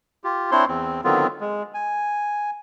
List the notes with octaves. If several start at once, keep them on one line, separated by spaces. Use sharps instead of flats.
F4 G4
C4 D4 E4 C5 C#5 C6
E2 C4
D3 D#3 F#3 B3 C4 F4
G#3
G#5